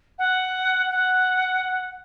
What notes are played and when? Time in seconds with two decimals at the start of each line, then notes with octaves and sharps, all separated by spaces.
0.19 F#5
0.90 F#5